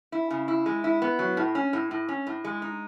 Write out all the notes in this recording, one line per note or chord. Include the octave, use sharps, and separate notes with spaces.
E4
C#3
E4
G#3
E4
B3
F#3
A2
C#4
A2
A2
C#4
A2
G#3
D#4